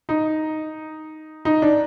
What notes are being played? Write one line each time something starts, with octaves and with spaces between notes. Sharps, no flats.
D#4
D#4
D4